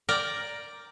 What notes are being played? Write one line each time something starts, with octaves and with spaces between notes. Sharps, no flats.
A#4 D5 G5 A#5